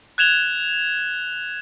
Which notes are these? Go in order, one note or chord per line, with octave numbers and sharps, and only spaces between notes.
F#6 G#6 E7 F7 G7